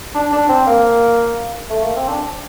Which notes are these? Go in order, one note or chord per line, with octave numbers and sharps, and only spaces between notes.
D4
D4
C4
A#3
A3
A#3
C4
D4